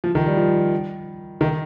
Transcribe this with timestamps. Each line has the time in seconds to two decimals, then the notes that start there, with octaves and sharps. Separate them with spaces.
0.04 F3
0.15 D#3
0.26 G3
0.37 F3
1.41 D#3